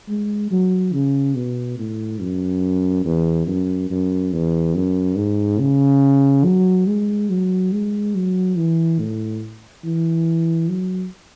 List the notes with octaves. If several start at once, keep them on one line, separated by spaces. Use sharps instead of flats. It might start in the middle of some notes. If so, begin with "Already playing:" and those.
G#3
F#3
C#3
B2
A2
F#2
E2
F#2
F#2
E2
F#2
G#2
C#3
F#3
G#3
F#3
G#3
F#3
E3
A2
E3
F#3